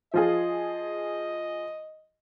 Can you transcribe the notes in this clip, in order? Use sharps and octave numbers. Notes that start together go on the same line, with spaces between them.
F3 F4 G#4 D#5